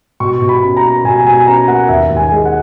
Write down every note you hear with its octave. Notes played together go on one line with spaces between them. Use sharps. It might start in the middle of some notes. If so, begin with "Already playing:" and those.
B2 C#6
B2
B5
C#4
A#5
A#3
B2 G#5
B2 G#5
C#4 A#5
A#3 F#5
D#2 E5
D#2
G#5
G#3
F#5